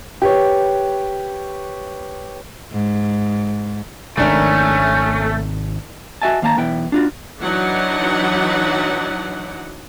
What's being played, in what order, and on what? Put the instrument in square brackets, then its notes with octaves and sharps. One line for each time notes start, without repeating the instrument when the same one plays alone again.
[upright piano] G4 B4 C#5
[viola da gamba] G#2
[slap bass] G#1 C3 [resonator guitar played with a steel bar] D#3 D4 A#4 [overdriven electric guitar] A3 [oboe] C#4
[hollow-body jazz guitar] F#4 D#5 E5 G#5 A5
D#2 A#3 F5 A5 A#5
B1 E2 B3 E4 G5
D4 F4 F#4
[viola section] E3 F#3 D4 D#4 F#5